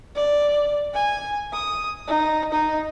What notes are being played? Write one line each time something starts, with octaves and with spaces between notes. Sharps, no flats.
D5
G#5
D#6
D#4
D#4